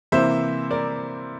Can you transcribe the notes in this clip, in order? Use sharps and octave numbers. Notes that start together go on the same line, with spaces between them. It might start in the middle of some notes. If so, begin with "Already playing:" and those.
C3 E3 A#3 C5 E5
A#4 D5